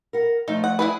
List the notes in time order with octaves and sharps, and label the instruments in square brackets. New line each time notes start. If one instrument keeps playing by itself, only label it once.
[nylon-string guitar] A#4 F#5
[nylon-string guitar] F3 A3 [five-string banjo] D#4
[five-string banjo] F#5
E4 G#4 B4